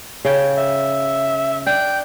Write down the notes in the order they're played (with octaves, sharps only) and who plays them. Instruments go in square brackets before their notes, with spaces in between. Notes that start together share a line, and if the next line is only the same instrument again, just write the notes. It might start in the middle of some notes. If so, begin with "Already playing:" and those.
[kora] C#3 G5
[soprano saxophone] E5
[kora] D4 [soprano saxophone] G5